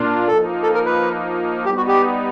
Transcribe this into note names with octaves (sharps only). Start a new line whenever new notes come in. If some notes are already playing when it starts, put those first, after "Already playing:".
Already playing: A#2 A#3 D4 F4
F3 A#3 D#4 A4
A4
A#4
B4
G3 B3 D#4 G4
F#4
G4